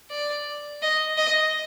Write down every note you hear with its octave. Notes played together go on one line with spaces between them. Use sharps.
D5
D#5
D#5